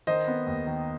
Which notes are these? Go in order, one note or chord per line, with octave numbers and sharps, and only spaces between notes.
D#3 C5 D#5
B3
D#2
D#3